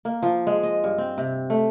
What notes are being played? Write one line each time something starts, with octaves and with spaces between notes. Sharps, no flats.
A#3
F3
G#3
D#5
G2
C4
C3
A3